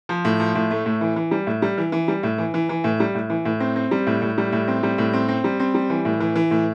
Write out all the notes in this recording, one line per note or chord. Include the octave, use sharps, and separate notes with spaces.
F3
A2
F3
A2
A3
A2
E3
E3
G3
A2
G3
E3
E3
G3
A2
E3
E3
E3
A2
G3
A2
E3
A2
C4
C4
G3
A2
A2
G3
A2
C4
G3
A2
C4
C4
G3
C4
G3
E3
A2
E3
E3
A2